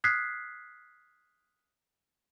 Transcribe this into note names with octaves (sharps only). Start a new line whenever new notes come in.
D#6 F6 F#6 G#6 B6 C7